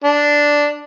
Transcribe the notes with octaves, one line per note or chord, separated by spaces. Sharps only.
D4